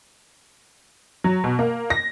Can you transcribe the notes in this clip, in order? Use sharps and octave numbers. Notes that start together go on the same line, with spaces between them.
F#3
B2
A#3
A#6